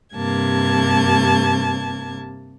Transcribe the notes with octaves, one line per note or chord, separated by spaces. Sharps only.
G2 C3 A#3 A5 G#6